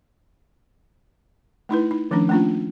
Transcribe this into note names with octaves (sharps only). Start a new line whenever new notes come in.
A3 D#4 E4 B4
D#4
D#3 F3 A3 C#4 D4
A3 A#3 C#4 D4 F4